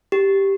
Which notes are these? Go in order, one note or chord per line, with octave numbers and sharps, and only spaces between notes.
G4